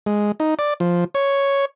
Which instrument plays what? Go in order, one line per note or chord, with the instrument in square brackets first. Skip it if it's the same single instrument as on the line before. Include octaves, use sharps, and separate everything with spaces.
[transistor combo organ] G#3
D#4
D5
F3
C#5